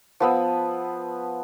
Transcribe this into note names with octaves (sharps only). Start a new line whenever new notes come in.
F3 B3 E6